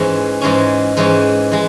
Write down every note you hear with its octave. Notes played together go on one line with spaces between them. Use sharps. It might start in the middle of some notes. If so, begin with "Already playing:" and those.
Already playing: G#2 E3 G#3 C#4
G#2 E3 G#3 C#4
G#2 E3 G#3 C#4
E3 G#3